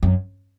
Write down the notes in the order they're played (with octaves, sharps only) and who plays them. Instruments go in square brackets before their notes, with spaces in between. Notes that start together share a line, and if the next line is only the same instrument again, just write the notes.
[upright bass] F#2